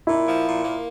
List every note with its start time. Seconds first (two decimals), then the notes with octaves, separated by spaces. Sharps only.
0.07 A#2 E4
0.26 F3
0.45 A#2
0.63 A#3